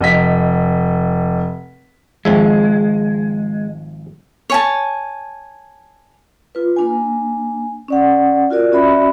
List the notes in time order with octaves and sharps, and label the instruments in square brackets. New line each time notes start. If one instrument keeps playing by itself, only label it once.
[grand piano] F1 D#5 B6
[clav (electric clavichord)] G#1 F3 E5 [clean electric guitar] G#3
[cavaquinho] C#5 G#5 A5
[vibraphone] F4 B4
A#3 D4 G#5
C#4 D5 F#5
F4 F#4 A#4 D5
C#4 F#4 D5 E5 B5